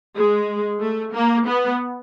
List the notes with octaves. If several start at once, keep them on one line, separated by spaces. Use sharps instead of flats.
G#3
A3
A#3
B3